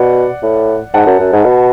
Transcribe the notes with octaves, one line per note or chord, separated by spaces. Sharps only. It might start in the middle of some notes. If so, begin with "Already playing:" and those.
Already playing: B2 D5 F#5
A2
G#2 F#5 A5
F#2
F#2
G#2
B2